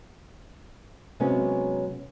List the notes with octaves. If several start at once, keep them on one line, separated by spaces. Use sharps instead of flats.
C3 F#3 G#3 B3 C#4